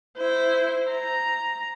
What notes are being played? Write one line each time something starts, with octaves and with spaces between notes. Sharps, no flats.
E4 C5
A#5